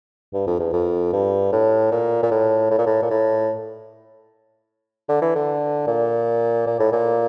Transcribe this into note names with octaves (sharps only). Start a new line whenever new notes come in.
G2
F2
E2
F2
G2
A2
A#2
A#2
A2
A2
A#2
A2
A#2
A2
D3
E3
D3
A#2
A#2
A2
A#2